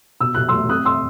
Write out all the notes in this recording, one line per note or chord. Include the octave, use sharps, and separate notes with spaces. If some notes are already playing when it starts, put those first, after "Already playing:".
B2 E6
B2 F#6
A3 C6 E6
C4 D#6 F#6
C6 E6